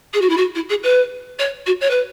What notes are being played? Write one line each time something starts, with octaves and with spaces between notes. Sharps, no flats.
G#4
F#4
E4
F#4
E4
G#4
B4
C#5
F#4
C#5
B4